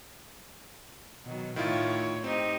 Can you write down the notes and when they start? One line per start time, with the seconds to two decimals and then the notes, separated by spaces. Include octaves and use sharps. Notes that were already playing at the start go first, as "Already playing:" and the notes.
1.24 B2 D#3 F#3
1.56 A2 D#3 A3 E4 F4 C#5
2.24 C4 D#4 G4